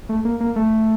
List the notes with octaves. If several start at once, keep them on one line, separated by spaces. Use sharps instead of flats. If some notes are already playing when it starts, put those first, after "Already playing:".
A3
A#3
A#3
A3